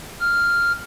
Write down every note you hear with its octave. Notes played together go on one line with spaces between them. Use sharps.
F6